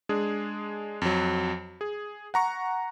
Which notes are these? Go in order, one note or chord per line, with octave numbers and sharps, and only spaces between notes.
G#3 D4 G#4
F2 F#3
G#4
F#5 A#5 C#6